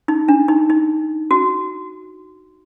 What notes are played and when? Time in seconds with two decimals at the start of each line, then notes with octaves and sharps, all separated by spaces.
0.08 D#4
0.28 D4
0.48 D#4
0.70 D#4
1.31 F#4